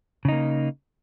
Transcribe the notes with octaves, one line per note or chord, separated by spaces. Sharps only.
C#3 A#3 D#4